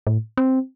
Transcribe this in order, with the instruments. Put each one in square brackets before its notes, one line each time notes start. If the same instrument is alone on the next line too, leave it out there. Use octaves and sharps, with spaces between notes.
[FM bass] A2
C4